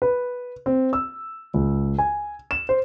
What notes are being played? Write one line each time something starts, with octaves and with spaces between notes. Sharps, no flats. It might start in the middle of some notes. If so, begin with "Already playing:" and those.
B4
C4
E6
C#2
G#5
E7
C5